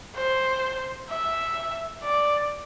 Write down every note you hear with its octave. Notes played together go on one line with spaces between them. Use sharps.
C5
E5
D5